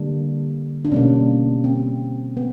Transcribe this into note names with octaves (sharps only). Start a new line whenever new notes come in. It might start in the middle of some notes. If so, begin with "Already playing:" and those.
Already playing: D3 G3 A#3 D4
D4
B2 G3 A#3 C#4
C4
B3